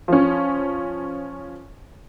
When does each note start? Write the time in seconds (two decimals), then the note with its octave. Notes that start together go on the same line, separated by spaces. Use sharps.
0.08 F3 C#4